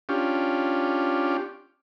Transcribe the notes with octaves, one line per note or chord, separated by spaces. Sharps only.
C#4 D4 F4 G4